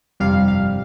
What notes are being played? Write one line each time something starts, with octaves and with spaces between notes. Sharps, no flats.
G1 F2 C3 G3 F5
F5